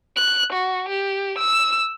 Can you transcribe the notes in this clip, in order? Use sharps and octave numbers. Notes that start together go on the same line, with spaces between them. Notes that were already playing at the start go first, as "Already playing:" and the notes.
F#6
F#4
G4
E6